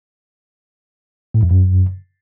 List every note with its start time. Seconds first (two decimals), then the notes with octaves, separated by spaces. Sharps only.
1.34 A2
1.43 F2
1.51 F#2